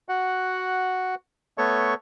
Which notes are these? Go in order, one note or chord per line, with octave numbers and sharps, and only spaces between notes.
F#4 F#5
A3 B3 A4 C#5 C#6